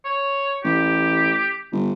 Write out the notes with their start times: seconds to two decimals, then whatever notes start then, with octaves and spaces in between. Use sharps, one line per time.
0.05 C#5
0.64 A1 G4
1.72 G1